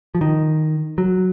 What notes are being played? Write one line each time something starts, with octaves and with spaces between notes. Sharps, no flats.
F3
D#3
F#3